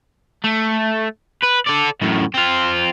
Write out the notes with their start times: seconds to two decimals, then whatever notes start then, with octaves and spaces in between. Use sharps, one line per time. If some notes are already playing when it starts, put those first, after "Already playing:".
0.44 A3
1.42 B4
1.66 A4 D5
2.01 F#2 A2
2.34 C4 F4